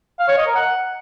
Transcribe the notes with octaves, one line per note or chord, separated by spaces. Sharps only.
F5
C#5
D#5
A#4
F#5